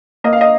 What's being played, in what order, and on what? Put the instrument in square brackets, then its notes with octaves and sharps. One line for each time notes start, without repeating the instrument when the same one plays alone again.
[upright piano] A#3 D#5
F5
D#5